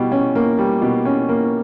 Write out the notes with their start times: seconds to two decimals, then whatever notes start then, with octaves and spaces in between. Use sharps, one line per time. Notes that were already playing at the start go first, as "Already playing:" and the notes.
Already playing: B2 G3
0.12 C#4
0.35 A#3
0.59 G3
0.82 B2
1.05 C#4
1.29 A#3